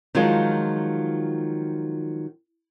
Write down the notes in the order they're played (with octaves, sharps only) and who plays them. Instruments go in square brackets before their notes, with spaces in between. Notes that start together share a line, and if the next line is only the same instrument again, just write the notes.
[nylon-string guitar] D#3 F3 F#3 G#3 F4